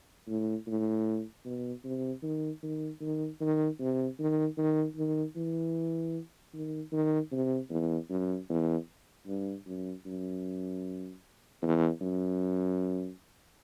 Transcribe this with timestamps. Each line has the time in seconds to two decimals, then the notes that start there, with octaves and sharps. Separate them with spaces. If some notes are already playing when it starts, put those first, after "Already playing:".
0.28 A2
0.67 A2
1.45 B2
1.84 C3
2.23 D#3
2.63 D#3
3.01 D#3
3.41 D#3
3.80 C3
4.19 D#3
4.58 D#3
4.96 D#3
5.36 E3
6.54 D#3
6.92 D#3
7.32 C3
7.70 E2
8.10 F#2
8.49 E2
9.27 G2
9.66 F#2
10.06 F#2
11.62 E2
12.01 F#2